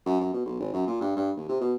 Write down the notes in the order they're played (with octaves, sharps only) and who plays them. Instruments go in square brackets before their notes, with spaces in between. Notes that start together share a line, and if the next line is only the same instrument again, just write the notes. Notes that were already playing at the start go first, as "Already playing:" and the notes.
[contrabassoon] F#2
F#2
B2
B1
G#1
F#2
A#2
G2
G2
D#2
C3
B2